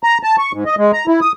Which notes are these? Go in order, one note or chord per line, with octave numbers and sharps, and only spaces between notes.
A#5
A5
C#6
G#2
D#5
G#3
A#5
E4
D#6